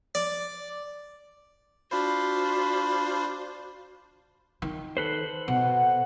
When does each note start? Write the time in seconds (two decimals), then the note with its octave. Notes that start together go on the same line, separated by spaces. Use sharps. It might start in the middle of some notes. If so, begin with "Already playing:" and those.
0.15 D5
1.91 D4 F4 F#4 C5 B5
4.62 D#3
4.97 A4 B4 C5
5.48 B2 F#5